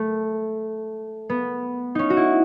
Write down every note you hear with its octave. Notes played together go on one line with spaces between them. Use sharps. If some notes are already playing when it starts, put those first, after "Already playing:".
Already playing: A3
B3
C#4 D#4
F#4
E4